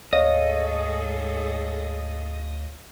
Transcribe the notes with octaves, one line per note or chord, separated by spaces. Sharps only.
D2 G#2 G#4 A4 C#5 D#5 F5